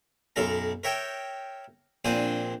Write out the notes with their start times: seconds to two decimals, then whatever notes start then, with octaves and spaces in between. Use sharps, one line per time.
0.36 B1 F#2 A4 A#4 A#5
0.84 A#4 C#5 E5 G5
2.05 A#1 A#2 C4 D4 C5 G#5